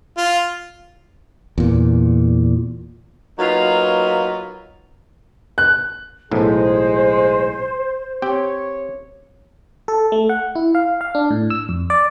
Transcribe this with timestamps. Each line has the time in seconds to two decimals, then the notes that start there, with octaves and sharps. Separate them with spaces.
0.17 F4
1.58 E2 A#2
3.39 F#3 A#3 B3 D#4 F4
5.58 F#6
6.31 B1 A2 E3 G#3 G#4 C5
8.22 C4 G4 C#5 G5
9.88 A4
10.12 A3
10.29 F#5
10.55 E4
10.75 F5
11.01 F5
11.15 D4
11.31 A2
11.50 E6
11.69 F2
11.90 D5